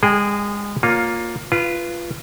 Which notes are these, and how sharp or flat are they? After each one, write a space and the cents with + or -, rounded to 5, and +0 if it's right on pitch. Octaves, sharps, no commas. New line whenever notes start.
G#3 -25 G#4 +0 G5 +0
A#3 +0 F4 +15 C#5 +0
F4 -20 B4 +0